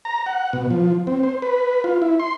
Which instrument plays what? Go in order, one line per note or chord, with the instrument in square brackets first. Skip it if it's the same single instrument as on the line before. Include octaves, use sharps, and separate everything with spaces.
[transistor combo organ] A#5
F#5
B2
F3
C4
C5
B4
F4
E4
C6